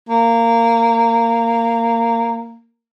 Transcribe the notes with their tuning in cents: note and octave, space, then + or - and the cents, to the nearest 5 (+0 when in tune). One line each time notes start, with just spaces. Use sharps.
A#3 -15